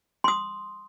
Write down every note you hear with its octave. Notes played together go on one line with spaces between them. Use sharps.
C6 D#6